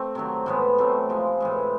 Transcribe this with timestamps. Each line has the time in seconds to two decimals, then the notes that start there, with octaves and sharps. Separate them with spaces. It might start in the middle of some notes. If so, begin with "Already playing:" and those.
Already playing: A3 C4
0.15 C3 D#3 F#3
0.46 A2 E3 G#3 B3
0.78 A2 F#3 A3 C4
1.09 C3 F3 G#3
1.40 A2 E3 G#3